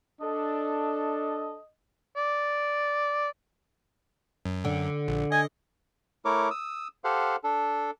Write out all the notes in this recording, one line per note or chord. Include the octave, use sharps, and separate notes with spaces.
D4 A4 D#5
D5
F#2
D3
A#1
D#5 G#5
A3 E4 A#4 C#5 D6
D#6 E6
G4 A4 C5 F5 F#5
D4 A4